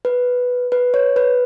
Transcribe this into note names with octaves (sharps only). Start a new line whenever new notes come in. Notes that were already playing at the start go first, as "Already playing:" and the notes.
B4
B4
C#5
B4